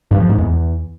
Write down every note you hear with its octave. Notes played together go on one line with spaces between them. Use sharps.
G2
F3
G#2
E2